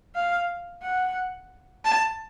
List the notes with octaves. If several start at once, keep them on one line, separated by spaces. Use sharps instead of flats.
F5
F#5
A5